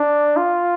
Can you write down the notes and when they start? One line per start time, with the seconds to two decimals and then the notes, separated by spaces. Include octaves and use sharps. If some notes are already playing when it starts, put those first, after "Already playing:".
Already playing: D4
0.37 F4